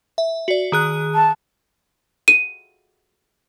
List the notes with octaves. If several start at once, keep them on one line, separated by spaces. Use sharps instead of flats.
E5
F#4 D5
D#3 G#4 F#6
A5
D#7